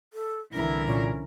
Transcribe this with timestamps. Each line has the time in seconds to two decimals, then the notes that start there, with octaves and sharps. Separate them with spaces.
0.13 A4
0.53 C2 D3 E3 E4 A#4
0.86 A#2 C#4